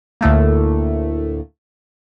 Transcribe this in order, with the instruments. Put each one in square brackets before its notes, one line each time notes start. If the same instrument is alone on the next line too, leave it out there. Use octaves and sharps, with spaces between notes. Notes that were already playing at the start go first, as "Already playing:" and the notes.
[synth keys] D2 A2 A3 A#3